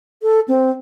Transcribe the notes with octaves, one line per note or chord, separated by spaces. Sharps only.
A4
C4